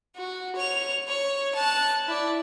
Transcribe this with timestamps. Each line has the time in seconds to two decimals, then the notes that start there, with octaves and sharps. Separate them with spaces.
0.16 F#4
0.56 C#5 F7
1.08 C#5
1.55 A5 F#6
2.08 E4 D5